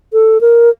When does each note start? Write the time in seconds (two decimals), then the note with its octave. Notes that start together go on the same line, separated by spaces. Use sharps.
0.13 A4
0.41 A#4